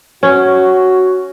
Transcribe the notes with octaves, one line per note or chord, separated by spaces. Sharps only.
C#4 F#4